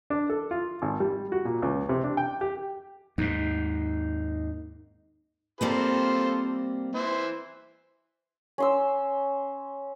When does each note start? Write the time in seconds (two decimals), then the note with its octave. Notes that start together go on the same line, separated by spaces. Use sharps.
0.10 D4
0.30 A4
0.51 F4
0.82 G#1
1.00 G3
1.32 F#4
1.45 A#2
1.62 C#2
1.89 C3
2.04 D4
2.17 G5
2.41 G4
3.18 D#2 G#2 D#4
5.61 G3 A#3 C4 F4 A4 C5
6.95 E3 C5 E5
8.58 C#4 C6 E6